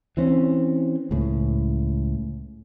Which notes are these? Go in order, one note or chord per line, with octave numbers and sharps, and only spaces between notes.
E3 C4 C#4
C#2 A2